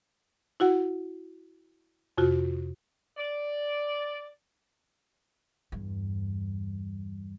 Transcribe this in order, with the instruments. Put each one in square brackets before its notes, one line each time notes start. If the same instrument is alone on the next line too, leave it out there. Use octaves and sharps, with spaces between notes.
[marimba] E4 F#4 F#5
F2 C3 F4 F#4
[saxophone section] D5
[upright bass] E2 G2